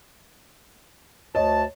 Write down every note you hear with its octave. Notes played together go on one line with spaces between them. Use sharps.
D2 C#5 D#5 A5